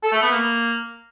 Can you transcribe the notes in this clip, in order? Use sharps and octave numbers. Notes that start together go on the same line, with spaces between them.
A4
A3
B3
A#3